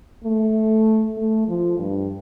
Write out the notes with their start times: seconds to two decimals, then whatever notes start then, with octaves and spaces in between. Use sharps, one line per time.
0.24 A3
1.17 A3
1.48 F3
1.78 G2